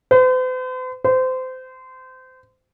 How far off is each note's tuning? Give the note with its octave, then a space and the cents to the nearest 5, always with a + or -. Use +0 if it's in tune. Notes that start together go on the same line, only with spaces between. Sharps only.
C5 -45
C5 -25